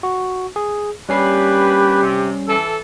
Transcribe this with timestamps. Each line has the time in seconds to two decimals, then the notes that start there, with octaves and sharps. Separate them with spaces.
0.03 F#4
0.56 G#4
1.09 G3 A#3 C#4 D4 G4 B4 C7
2.02 C3
2.48 E3 A4